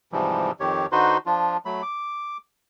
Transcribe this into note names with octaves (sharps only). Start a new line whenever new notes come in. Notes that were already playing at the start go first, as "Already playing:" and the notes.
G#2 C3 E3 F3 G3
F2 D#3 G4 C#5
D3 D#4 F#4 B4 C5 C6
F3 D4 F4
F#3 A3 B5
D6